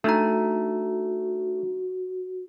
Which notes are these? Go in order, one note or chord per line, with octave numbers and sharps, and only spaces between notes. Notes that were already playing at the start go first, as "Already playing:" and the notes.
A3 D4 D#4 F#4 A#5